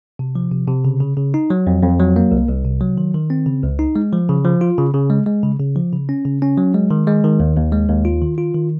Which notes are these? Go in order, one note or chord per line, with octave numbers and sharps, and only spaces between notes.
C3
F3
C3
C3
C#3
C#3
C#3
D#4
F#3
F2
F2
F#3
A#3
C2
C2
C3
F#3
D#3
D#3
C4
C#3
C#2
D#4
G#3
F3
C#3
F3
F4
C#3
C#3
G#3
G#3
C#3
C#3
F3
C#3
C#4
C#3
C#4
F#3
G#3
D#3
G#3
D#3
D#2
D#2
G#3
D#2
F4
D#3
F4
D#3